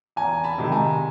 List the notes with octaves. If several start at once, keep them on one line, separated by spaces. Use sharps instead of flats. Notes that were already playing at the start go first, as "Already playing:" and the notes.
E2 G#5 A#5
A5 B5
C3 D#3 G#3
G#5 A#5